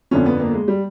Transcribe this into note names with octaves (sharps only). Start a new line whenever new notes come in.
G1 F2 D3 F3 C#4
B3
A#3
G#3
G3